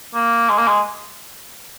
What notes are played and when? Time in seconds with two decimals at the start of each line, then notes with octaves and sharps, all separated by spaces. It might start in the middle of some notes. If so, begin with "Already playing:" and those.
0.15 A#3
0.50 G#3
0.58 A#3
0.67 G#3